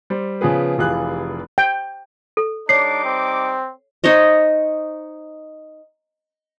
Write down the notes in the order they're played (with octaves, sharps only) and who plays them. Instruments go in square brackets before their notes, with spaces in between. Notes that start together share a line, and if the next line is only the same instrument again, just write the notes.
[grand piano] G3 C5
C#3 F3 B3 G#4 B4
F1 E3 F4 G4 G#4 F#6
[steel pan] G5
[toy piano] A4
[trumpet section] G3 D#4 D6 [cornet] D4 [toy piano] C#5 [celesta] C7
[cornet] C4
[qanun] D#4 C5 C#5 D#5